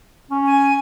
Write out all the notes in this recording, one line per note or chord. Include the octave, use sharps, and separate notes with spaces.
C#4
G#5